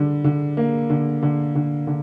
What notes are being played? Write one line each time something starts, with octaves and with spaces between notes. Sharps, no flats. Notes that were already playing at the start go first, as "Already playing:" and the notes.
Already playing: D3 G3
D3
A#3
D3
D3
D3
D3